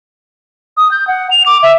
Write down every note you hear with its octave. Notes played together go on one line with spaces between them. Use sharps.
D#6
G6
F#5
F7
D6
E5